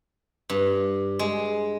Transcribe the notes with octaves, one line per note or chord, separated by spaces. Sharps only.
G2
G#3